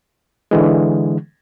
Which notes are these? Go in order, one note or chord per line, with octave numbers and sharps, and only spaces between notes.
D3 E3 G#3